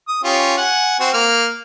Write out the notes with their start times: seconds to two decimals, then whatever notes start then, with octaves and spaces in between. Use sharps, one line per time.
0.08 D#6
0.24 C#4 F4 G4
0.58 F#5 G#5
1.00 C4 F#4
1.14 A#3 F6